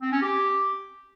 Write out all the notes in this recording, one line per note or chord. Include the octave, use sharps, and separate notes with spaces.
C4
C#4
G4